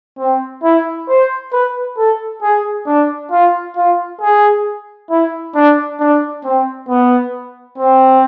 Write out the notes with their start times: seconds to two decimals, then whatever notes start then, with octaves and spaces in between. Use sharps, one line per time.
0.19 C4
0.64 E4
1.09 C5
1.52 B4
1.98 A4
2.42 G#4
2.87 D4
3.31 F4
3.76 F4
4.21 G#4
5.10 E4
5.55 D4
6.00 D4
6.44 C4
6.89 B3
7.78 C4